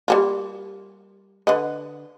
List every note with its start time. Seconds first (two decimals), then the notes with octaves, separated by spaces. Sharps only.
0.08 G3 A#3 F4
1.47 D3 B4 D#5